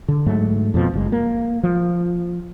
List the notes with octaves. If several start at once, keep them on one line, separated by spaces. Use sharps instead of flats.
D3
G#2 F#3 A3
F2 B2 F3
F#1 A2 G#3
A#3
F3